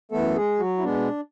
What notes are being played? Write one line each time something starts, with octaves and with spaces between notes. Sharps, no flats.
F#2 E3 A3 B3 A4
G#3 G#4
F#3 F#4
E4
B2 G#3 B3 D4